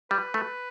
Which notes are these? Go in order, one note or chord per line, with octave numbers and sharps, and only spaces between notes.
G3 B4
A3